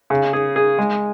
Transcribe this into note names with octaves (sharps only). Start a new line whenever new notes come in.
C#3
G#4
G#4
G#3